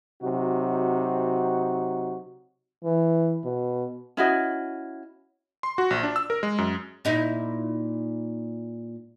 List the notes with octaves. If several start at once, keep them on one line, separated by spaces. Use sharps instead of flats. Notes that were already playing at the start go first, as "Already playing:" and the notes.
C3 F#3 D#4 F#4
E3
B2
C#4 E4 F#4 D#5
C6
F#4
A#1
D4
E6
A#4
G#3
F#2
A#2 D#4 E4